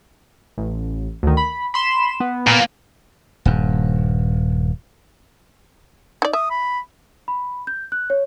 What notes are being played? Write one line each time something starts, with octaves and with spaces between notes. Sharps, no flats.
A1
D2 D#3
B5
B5 C6 E7
B3
A#2 A#3
D#1 G2
D#4 D5
E5 D#6
B5
B5
G6
F#6
C#5